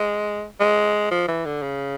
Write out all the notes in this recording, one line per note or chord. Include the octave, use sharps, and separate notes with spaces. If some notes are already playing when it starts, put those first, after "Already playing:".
Already playing: G#3
G#3
F3
E3
D3
C#3